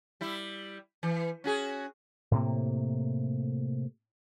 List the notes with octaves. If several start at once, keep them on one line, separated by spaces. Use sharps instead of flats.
G3 E4
E3
C#4 F#4 G#4
A2 C3 A#3